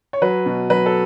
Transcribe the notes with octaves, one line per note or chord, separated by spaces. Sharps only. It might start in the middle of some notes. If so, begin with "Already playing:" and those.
C#5
F#3 B4
B2
F#3 B4
A4